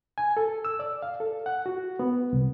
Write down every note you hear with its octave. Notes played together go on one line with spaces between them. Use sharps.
G#5
A4
E6
D5
F5
A4
F#5
F#4
B3
C2